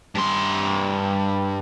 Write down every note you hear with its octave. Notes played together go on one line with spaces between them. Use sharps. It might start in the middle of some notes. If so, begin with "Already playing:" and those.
G2 C6